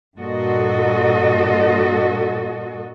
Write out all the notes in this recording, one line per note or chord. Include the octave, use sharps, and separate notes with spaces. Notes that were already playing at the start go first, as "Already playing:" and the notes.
G2 A#2 F#4 A4 D#5